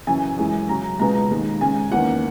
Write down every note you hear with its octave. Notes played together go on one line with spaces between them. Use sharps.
F#2 C#3 E3 G#5
F#2 E3 G#3
C#3 F#3 C#4 A#5
C#2 B2 G#3 B3 A#5
D#2 D#3 G#3
C#3 G#3 C#4 G#5
E2 D#3 A#3 C#4 F#5